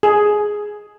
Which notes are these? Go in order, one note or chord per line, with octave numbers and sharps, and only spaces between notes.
G#4